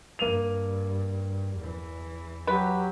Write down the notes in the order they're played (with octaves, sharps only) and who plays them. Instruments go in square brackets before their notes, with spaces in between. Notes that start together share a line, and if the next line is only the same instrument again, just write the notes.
[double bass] G2 [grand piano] A#3 D#7 F7
[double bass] E2 E3
[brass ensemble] F#3 G4 [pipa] B4